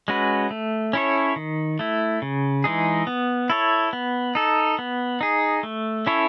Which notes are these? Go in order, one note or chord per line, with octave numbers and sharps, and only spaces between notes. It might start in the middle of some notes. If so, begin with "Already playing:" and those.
G#3 C#4 F#4 B4
A3
C#4 E4 A4 C#5
D#3
A3 E4
C#3
E3 G#3 D#4 G#4
B3
E4 A4 C#5
B3
D#4 A4
B3
D#4 G#4
A3
C#4 E4 A4 C#5